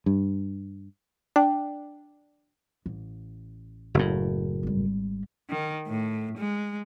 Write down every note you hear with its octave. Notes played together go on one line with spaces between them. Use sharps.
G2
D4 G5
A1
F#1 A2
G#1 G3
D#3
A2
G#3